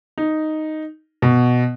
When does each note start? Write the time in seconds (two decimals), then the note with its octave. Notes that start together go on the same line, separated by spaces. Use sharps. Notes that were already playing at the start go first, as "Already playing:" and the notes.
0.18 D#4
1.22 B2